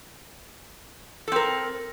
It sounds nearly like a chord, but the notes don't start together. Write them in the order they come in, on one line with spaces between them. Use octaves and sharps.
A4 C4 A#4